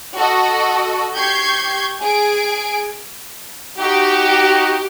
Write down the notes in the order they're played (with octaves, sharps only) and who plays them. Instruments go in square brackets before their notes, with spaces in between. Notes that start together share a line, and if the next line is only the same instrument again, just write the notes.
[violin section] F#4 A4 D#5
G4 C#6 G6 G#6 C7
G#4 G#5 D7
[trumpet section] D#4 F#4 [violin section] G4